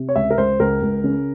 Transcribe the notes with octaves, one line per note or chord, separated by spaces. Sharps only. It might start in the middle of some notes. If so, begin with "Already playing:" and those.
Already playing: C3
C#5
C#2 E5
A#4
C#2 C5
C#2 A#4
C#2
C#3